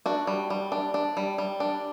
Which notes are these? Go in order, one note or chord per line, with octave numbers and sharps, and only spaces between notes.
D4 F#4
G3
G3
D4
D4
G3
G3
D4